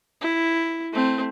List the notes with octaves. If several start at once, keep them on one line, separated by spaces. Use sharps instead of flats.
E4
A3 C4